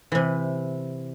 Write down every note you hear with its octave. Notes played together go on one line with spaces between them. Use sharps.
C3 E3